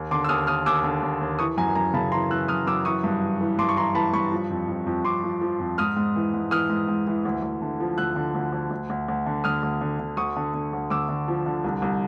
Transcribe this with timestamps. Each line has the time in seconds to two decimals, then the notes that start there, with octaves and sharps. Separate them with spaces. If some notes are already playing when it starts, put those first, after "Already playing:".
Already playing: D#2
0.11 D3 C6 D6
0.24 E6
0.29 D#2 D#6 F6
0.47 D#2 D#6 F6
0.66 D#2 D6 E6
0.84 D3
1.02 D#2
1.21 D#2
1.39 E3 C#6 D#6
1.57 F#2 G#5 A#5
1.75 F#2 G#5 A#5
1.93 C#3 A5 B5
2.12 E3 A#5 C6
2.30 E3 E6 F#6
2.48 F#2 D#6 F6
2.67 F#2 D6 E6
2.85 E3 C#6 D#6
3.04 G2
3.22 E3
3.41 E3
3.59 G2 C6 D6
3.69 C#6
3.77 E3 A#5 C6
3.95 E3 A5 B5
4.13 G2 B5 C#6
4.32 F3
4.50 F2
4.68 F2
4.86 F2
5.05 F2 C6 D6
5.23 F3
5.41 F3
5.60 F2
5.78 G#2 D#6 F6
5.96 G#2
6.16 E3
6.34 G#2
6.51 E3 D#6 F6
6.69 G#2
6.88 G#2
7.07 E3
7.25 D2
7.43 D2
7.62 D3
7.80 F3
7.98 D2 E6 F#6
8.16 D3
8.35 D2
8.52 D2
8.71 D2
8.90 D2
9.08 D2
9.26 D3
9.44 D2 D#6 F6
9.63 D2
9.81 D3
10.00 D3
10.17 D2 C#6 D#6
10.36 D3
10.54 D3
10.73 D2
10.90 D2 D6 E6
11.09 D3
11.28 F3
11.46 D3
11.64 C2
11.82 C2